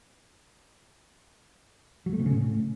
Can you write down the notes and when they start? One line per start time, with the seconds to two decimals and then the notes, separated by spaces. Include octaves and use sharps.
2.06 F#3
2.13 A3
2.19 C3
2.26 C#3
2.32 A2